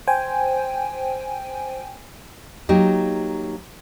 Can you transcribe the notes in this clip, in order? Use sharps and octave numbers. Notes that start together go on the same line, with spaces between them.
C5 G5 G#5
F#3 A#3 D#4 G4